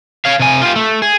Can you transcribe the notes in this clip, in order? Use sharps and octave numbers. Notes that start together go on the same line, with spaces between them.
C#5 F5
C3 G#5
F4 G4
A3
G#4